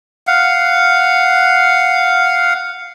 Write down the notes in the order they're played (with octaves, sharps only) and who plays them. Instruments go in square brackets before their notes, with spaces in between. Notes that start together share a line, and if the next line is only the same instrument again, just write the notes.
[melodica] F5 F#5